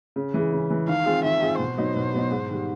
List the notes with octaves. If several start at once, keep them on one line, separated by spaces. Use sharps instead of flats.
C#3
E3 G#3
C#3
E3 G#3
D#3 F5
G#3 C4 F4 G#4
D#3 E5
G#3 C4 F4 G#4
B2 C5
F#3 B3 D#4
B2
F#3 B3 D#4
G#2
D#3 G3